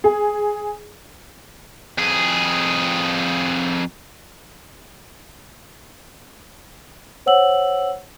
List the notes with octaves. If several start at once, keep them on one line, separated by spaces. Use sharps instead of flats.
G#4
F2 G#4
C5 C#5 F#5 E6 F#7